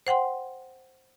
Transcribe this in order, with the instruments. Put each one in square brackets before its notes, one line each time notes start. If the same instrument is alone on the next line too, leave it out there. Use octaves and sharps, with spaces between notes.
[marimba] C5 F#5 G5 C6